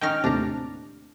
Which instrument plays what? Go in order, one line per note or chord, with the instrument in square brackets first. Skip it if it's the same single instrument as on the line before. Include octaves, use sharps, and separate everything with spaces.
[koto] D#3 C#4 D#4 [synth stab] G5 F6
[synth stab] D#2 A2 C3 [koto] D4 A#5